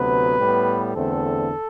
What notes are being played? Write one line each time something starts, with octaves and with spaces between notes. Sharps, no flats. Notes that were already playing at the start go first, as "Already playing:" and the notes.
Already playing: D2 C3 F#3 B3 B4
A2 G3 B3
E2 D3 A3 C4 A4